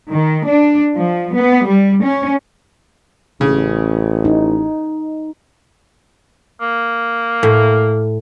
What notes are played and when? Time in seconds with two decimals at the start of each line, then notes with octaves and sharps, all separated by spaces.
0.12 D#3
0.47 D4
0.96 F3
1.34 B3
1.66 G3
2.02 C#4
3.41 A1 C#3
4.25 D#4
6.61 A#3
7.43 A2